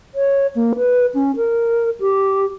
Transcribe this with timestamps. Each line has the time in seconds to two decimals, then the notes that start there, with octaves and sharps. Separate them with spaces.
0.15 C#5
0.55 A#3
0.76 B4
1.14 C#4
1.36 A#4
2.00 G4